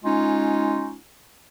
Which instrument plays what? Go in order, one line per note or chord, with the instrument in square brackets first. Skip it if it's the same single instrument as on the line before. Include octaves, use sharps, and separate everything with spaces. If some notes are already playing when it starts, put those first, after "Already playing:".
[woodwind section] G#3 C#4 D#4 F4